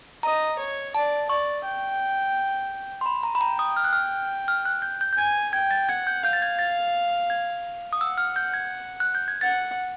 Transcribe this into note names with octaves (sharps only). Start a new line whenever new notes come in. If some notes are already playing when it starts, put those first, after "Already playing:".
D#5 A#5
C#5
D5 A5
D5 C#6
G5
C6
B5
A#5
B5
G5 A#5
D#6
F6
F#6
F6
F6
F#6
G6
G6
G6
G#5 G#6
G5 G#6
A6
F#5 G#6
G6
F5 G6
A6
G#6
A6
G#6
D#6
F#5 E6
F6
G6
G#6
F#6
G6
G#6
F#5 A6